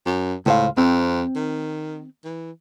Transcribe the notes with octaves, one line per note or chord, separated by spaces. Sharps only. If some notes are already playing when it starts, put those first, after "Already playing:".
F#2
C#2 A2 C5 F5
F2 C4
D#3
E3